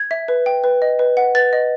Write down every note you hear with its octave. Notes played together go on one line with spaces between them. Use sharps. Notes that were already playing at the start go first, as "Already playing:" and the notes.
Already playing: G#6
E5
B4
G5
B4
D#5
B4
F#5
B4 A6
D#5